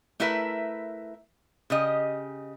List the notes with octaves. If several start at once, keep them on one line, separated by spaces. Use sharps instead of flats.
A3 E4 A#4 B4 E5
C#3 G4 D#5